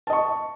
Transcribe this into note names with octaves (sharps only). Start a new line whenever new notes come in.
D#5 A5 C#6